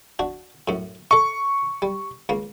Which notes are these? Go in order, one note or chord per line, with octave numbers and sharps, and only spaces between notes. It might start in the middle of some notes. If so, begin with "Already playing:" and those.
D4 F#4
F#2 A2
A4 D#5 C#6
G3
C#2 A#3